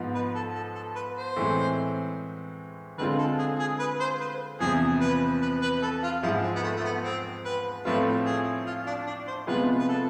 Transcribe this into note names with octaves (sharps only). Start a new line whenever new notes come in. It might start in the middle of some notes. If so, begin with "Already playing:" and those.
Already playing: G#2 F3 B3
B4
A4
A4
A4
B4
C5
A2 E3 G#3 C4
D3 G#3 C4 F4 B4
A4
G#4
G#4
B4
C5
B4
E2 C3 F3 G#4
B4
B4
B4
A4
F4
G#2 F3 G#3 E4
C4
B3
A3
A3
B3
C4
B4
A2 F3 A3 C4 F4 B4
G#4
F4
D4
D4
C5
C3 F3 G#3 B3 F4 B4
B4
A4